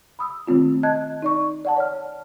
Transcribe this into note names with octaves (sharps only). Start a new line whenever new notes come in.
B5 D#6 E6
D#3 A3 C4 F4
D#5 A5 F#6 G#6
D#4 D5 C#6
D5 F#5 A5
C#5 F6